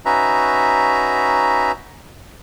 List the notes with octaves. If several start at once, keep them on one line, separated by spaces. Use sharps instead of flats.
C#4 D#4 F#4 B4 E5 A#5